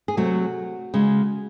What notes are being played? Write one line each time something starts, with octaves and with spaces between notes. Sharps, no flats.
G#4
C3 F#3 A3 F#4
C#3 G#3